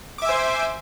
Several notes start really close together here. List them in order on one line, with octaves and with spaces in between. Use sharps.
D6 E5 G#5 C5